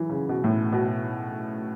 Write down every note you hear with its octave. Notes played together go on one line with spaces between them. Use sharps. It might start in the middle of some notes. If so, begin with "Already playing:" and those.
Already playing: E3 F#3
C#3
B2
A2
B2